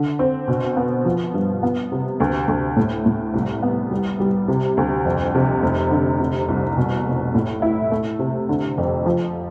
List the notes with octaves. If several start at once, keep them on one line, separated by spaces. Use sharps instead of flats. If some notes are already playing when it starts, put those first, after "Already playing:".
Already playing: D3
C4
B2
B3
F3
G2
B3
C3
D2
D2
A2
A2
C2
B3
G3
G3
C3
D2
F2
C3
F1
D3
C3
C2
B2
F1
A2
E4
A3
C3
D3
F2
F3